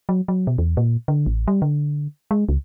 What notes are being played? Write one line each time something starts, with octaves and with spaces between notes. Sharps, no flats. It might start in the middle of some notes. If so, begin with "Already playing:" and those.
F#3
F#3
B2
E2
A#2
D3
A1
G3
D3
G#3
C#2